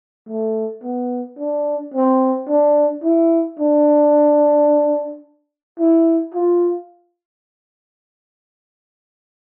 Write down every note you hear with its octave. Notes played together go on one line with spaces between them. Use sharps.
A3
B3
D4
C4
D4
E4
D4
E4
F4